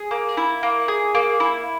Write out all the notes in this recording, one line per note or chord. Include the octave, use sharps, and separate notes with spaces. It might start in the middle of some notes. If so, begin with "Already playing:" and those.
Already playing: G#4
A#3
E4
A#3
G#4
A#3
E4